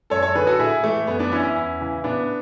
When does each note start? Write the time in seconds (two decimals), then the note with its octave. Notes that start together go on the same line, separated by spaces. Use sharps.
0.10 F#2 A4 C#5
0.23 A4 C#5
0.35 D3 G#4 B4
0.47 F#4 A4
0.59 A2 E4 G#4
0.83 E3 A3
1.07 F#2 B3
1.19 B3 D4
1.32 E3 C#4 E4
1.43 C#4 E4
1.57 E2
1.81 C#3 E3
2.04 A2 B3 D4